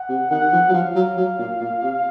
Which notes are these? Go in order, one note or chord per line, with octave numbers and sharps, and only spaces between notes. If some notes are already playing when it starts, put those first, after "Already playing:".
Already playing: F#5
C3
D#3 F#5
F3
F#3
F3 F5
F#3
F#3
A#2
A#2
C3